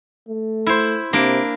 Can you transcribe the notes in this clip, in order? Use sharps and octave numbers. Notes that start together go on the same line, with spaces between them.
A3
E4 C5
C3 A#3 D4